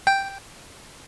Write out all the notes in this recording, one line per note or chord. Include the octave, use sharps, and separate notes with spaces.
G5